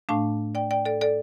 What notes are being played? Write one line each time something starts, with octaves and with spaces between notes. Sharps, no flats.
A2 A3 D4 F5 A5
D5 G5
D5 G5
A4 D5
A4 D5